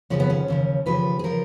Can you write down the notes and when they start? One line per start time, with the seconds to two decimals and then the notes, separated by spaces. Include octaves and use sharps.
0.10 D#2 C#3 F3 C#4
0.20 B3
0.30 C#4
0.48 D#2 C#3 F3
0.86 D#2 C#3 F3 B4
1.19 G#4
1.24 C#3 F3 A#4